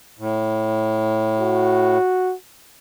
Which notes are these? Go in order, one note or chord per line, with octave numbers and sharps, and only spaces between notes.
A2
F#4